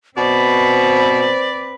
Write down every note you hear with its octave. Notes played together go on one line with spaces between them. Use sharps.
B2 C4 B4 C5 D5